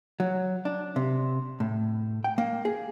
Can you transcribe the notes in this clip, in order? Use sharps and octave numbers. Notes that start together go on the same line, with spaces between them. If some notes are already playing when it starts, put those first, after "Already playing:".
F#3
D4
C3
A2
G5
A#3
G#4